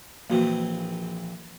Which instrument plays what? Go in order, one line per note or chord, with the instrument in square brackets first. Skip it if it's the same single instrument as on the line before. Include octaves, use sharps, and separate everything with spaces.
[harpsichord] A#1 E3 C4 [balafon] A#3 F#4